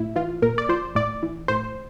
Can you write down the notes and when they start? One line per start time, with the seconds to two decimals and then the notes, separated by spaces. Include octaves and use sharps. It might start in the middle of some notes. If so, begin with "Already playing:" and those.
Already playing: A2 E4
0.16 E3 F4
0.42 A#2 A#4
0.58 D5
0.69 F3 C5
0.95 A2 D5
1.23 E3
1.48 A2 C5